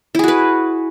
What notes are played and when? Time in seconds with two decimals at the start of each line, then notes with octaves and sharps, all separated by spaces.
0.15 E4
0.19 G#4
0.24 F#4
0.28 B4